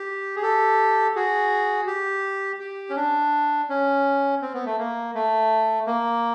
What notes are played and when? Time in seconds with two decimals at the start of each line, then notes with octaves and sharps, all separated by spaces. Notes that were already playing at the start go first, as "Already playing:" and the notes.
Already playing: G4
0.36 G#4
0.42 G4 A4
1.15 F#4 G#4
1.87 G4
2.60 G4
2.89 C#4
2.96 D4
3.70 C#4
4.42 C4
4.54 B3
4.65 A3
4.78 A#3
5.15 A3
5.87 A#3